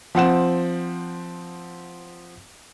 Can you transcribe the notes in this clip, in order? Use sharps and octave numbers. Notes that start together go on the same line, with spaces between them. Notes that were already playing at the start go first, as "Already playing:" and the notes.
F3 C4 F#5 E7